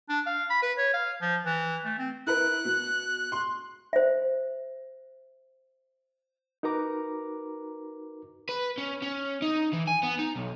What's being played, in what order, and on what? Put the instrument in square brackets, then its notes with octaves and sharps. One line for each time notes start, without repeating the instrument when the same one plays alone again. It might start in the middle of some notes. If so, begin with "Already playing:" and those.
[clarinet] D4
F5
B5
B4
C#5
F5
F3
E3
A3
C4
[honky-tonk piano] E4 A#4 B4 [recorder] F#6
[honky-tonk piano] B2
C6
[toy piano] C5 E5
[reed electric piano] D#4 F#4 A#4 B4 A#5 D6
[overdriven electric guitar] B4
C#4
C#4
D#4
E3
G#5
B3
D#4
B1